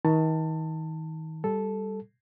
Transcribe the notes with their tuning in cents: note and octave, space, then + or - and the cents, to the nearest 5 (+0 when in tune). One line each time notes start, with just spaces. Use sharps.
D#3 +35 A5 +20
G3 +0 A4 -5